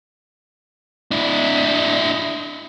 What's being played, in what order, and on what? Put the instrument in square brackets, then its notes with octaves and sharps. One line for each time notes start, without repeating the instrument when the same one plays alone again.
[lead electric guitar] D4 E4